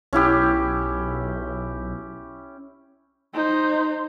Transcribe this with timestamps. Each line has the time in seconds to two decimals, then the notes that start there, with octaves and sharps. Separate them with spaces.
0.13 B1 C#4 E4 G4
3.34 D#4 C5